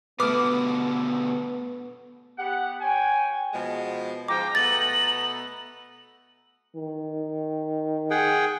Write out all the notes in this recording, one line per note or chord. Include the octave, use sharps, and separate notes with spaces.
B2 D3 A3 B3 B4 D6 D#6 F6
B3 G4 F#5
C#5 G5 G#5
B2 F3 G#3
G#2 F3 G5 A#5 D6
B2 A3 B3 A6 F#7
D#3
G#4 F#5 G5